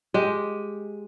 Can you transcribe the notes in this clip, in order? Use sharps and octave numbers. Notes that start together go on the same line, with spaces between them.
G#3 G4